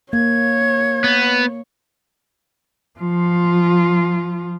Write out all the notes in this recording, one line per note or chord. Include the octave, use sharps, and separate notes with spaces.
A#3 C#5 G#6
B3
F3 F4